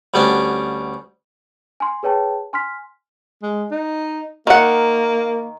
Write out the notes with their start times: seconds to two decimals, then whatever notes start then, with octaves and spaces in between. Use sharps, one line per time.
0.14 D2 G3 B3 C#4 D4
1.80 G#5 C6
2.03 G#4 B4 C#5 G5 A5
2.53 G#5 C6 F6 B6
3.43 G#3
3.71 D#4
4.47 D#3 A#3 F#5